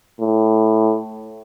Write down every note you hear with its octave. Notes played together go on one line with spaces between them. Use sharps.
A2